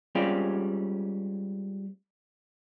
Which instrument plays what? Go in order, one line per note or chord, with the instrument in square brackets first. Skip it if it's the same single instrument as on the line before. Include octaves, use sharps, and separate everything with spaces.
[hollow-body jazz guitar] G3 G#3 C4 C#4 F4 G4